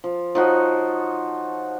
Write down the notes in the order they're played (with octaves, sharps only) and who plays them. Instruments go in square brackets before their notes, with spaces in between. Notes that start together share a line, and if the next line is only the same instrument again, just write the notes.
[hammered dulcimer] F3
F3 D#4 F#4 C#5